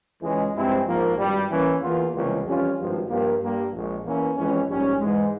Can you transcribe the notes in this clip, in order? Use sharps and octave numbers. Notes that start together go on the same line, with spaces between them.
C#2 C#3 E3 G#3
G2 F3 G#3 C4 E4
A#1 G#2 F3 A#3
G#1 G2 G3
E3 A#3 C#4
E2 E3 A#3 F4
C#2 C3 E3 G3 A#3
F2 E3 G3 C#4 F4
G#1 G2 F3
G2 F3 A#3
G2 G3 A#3
A#1 A#2 G#3
E2 E3 A#3 C#4 E4
F2 E3 G#3 C#4
A#1 G#2 G3 C#4
G#2 E3 G#3